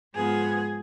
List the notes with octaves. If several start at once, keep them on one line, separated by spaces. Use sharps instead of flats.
G#2 F3 B3 G#4